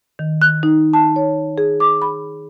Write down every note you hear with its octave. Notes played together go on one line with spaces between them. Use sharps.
D#3
F#6
D#4
A5
C#5
G#4
D6
B5